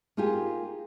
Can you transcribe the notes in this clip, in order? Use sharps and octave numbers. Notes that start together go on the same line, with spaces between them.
A#3 D#4 F4 G4 G#4